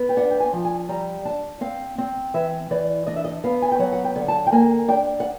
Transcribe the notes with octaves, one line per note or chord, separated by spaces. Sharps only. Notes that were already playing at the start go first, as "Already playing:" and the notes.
Already playing: B3
G5
D4 F#5
G5
G#5
F3
G#5
G3 A#5
D4 A5
C4 F5
C4
E3 E5
E3 D5
D4 D#5
E5
D#5
B3 F5
G#5
G5
F#3 F#5
F#5
G5
D3
A5
G5
A#3 G#5
D4 G5
F#5